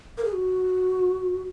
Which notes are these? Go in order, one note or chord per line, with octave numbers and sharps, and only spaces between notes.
A#4
G#4
F#4